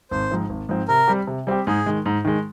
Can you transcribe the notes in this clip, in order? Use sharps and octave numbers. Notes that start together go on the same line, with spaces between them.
G#1 C5
G#2 F3 C4
G#1
G#2 F3 C4
C3 A#4
G3 C4 G4
C3
G3 C4 G4
G#2 G#4
D#3 G#3
G#2
D#3 G#3